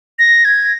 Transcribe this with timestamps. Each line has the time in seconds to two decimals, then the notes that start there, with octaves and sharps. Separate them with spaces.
0.19 A#6
0.45 G#6